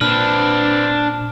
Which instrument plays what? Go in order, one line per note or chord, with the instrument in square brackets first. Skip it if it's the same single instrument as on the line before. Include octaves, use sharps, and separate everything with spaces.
[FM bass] A#2 [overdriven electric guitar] C4 B4 [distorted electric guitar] D4 [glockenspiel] F6